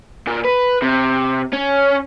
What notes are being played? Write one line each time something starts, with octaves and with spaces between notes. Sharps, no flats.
A#2
B4
C3
C#4